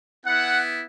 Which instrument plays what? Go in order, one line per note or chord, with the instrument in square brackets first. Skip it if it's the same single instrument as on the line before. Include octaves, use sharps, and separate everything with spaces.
[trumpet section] B3 E4 F#5